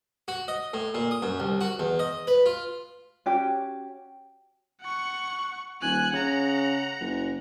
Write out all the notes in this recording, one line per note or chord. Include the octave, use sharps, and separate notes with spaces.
F#4
D#5
A2
A#2
D#6
F#2
C2
F#4
E2
D#5
B4
F4
C#4 F#4 G4 G5
F#5 C#6
D#1 G#5 F#6
C#3 F#5 A#5
F#1